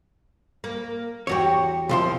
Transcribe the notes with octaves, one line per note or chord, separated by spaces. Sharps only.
A#3
E2 F#4 G4 C#5
C2 F3 C6